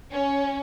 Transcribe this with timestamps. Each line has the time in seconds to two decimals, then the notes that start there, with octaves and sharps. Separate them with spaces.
0.12 C#4